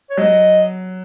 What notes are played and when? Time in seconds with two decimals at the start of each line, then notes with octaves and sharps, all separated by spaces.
0.10 C#5
0.17 F#3 D#5